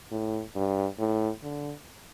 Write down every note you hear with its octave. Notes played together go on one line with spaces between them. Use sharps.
A2
G2
A2
D3